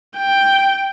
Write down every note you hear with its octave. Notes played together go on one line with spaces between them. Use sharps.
G5